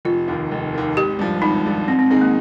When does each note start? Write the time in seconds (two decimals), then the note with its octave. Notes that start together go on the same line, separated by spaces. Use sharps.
0.05 F1 F4
0.28 D#2 D#3
0.51 F1
0.74 D#2 D#3
0.97 G#1 G4
1.19 G2 F3
1.42 G#1 D#4
1.66 G2 F3
1.88 G#2 C4
1.99 C4
2.10 D#3 G#3 C4 D#4
2.21 A#3